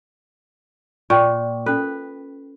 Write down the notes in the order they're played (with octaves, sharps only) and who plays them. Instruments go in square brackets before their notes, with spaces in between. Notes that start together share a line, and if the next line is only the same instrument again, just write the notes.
[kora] A#2 [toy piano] G5 C#6
[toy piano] C#4 A4 [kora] B4